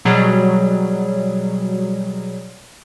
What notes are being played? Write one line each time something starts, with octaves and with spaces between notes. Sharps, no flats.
B2 F#3 G3 G#4